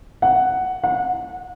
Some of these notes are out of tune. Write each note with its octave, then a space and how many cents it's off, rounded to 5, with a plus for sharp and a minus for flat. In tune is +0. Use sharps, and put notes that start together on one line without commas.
F#5 +5
F#5 -25